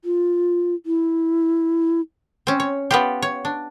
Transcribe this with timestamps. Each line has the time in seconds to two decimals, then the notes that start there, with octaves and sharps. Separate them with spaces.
0.05 F4
0.86 E4
2.47 C4 C#4
2.60 C#5
2.91 B3 F4 G4
3.22 C#5
3.45 D4